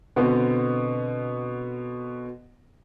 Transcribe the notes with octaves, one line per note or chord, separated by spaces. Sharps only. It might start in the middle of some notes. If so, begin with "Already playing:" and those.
B2 D3 B3 C4